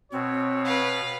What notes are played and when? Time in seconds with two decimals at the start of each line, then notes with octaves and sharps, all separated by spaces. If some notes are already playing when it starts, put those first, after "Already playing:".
0.12 B2 C4 C#5
0.65 B4 F5